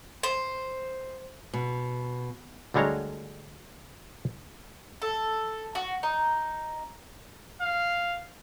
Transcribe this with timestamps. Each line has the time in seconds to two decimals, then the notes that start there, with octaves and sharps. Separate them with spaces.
0.23 C5
1.54 B2
2.74 D2 D3 G3 G#3 C#5 A#5
5.02 A4
5.75 F#4
6.03 D#4
7.62 F5